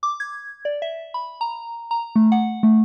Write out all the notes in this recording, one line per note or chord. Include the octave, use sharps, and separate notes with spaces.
D6
G#6
D5
E5
B5
A#5
A#5
A3
F#5
A3